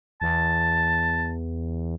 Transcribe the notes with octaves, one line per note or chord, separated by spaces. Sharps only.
E2 A5